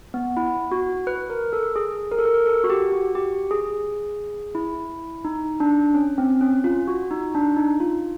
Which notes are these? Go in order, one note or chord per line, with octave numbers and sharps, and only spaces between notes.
B3
E4
F#4
B4
A#4
A4
G#4
A#4
A4
A#4
A4
F#4
G4
F#4
G4
G#4
E4
D#4
D4
C#4
C4
C#4
F4
F#4
D#4
D4
D#4
F4